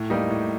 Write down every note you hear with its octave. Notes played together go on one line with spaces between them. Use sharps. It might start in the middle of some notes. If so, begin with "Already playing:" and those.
Already playing: A2
G3 A#3 D#4
A2